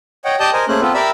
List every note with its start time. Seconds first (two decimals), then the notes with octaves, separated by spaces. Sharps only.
0.25 C#5 D#5 F#5 G5
0.40 G4 D5 D#5 A5 D#6 G6
0.53 A#4 C5 D#5 G#5
0.68 A3 A#3 C#4 G#4 C5 F#6
0.81 B3 C4 F4 A4 B4
0.94 G4 A#4 D5 E5 B5 E6